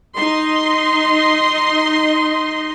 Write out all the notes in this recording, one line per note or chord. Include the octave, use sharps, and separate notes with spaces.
D#4 D#5 C6